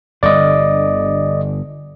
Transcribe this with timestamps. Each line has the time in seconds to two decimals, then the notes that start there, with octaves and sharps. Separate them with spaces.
0.23 G1 D3 D5 D#5